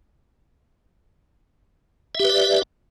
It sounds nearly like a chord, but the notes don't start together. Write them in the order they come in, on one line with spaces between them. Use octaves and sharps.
E5 G4 B4 D5